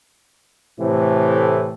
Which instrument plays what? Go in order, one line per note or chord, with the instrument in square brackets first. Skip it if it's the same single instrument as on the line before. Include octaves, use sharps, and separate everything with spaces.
[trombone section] A2 C3 E3 A3